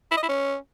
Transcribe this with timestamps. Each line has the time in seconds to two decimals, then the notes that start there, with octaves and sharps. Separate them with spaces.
0.11 E4
0.17 D#5
0.23 E4
0.29 C#4